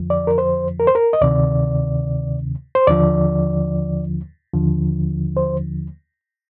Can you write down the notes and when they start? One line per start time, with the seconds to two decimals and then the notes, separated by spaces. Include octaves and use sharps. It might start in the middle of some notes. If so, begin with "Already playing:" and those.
Already playing: F2 D3 F3
0.10 D5
0.27 A#4
0.38 C5
0.80 A#4
0.87 C5
0.95 A#4
1.13 D#5
1.21 D2 C3 D#3 D5
2.75 C5
2.87 D#2 D3 F3 D5
4.53 D#2 D3 F3
5.37 C5